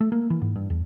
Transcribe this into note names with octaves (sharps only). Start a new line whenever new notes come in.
A3
A#3
E3
G#2
G2
E2